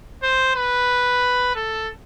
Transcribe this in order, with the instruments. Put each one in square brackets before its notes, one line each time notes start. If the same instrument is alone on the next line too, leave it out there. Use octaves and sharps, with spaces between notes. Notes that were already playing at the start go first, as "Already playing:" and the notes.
[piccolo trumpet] C5
B4
A4